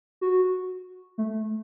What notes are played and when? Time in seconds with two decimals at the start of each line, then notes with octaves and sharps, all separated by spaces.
0.21 F#4
1.18 A3